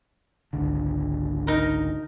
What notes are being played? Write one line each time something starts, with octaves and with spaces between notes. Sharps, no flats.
G#1 C#2 D3
D#4 A#4